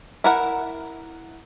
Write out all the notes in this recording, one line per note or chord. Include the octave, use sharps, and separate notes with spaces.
E4 A#4 F#5